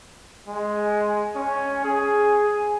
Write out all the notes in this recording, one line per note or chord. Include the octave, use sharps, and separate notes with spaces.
G#3
C#4
G#4